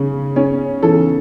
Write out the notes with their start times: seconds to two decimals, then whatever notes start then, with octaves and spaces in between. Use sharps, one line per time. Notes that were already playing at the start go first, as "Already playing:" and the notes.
Already playing: C#3 C#4
0.36 C#4
0.83 E3 A4